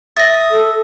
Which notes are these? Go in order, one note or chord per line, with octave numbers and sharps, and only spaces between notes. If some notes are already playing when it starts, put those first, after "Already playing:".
E5 D#6 A6 A#6
A4